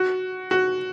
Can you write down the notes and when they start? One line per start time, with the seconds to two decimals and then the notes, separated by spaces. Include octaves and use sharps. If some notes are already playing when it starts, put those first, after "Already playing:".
Already playing: F#4
0.51 F#4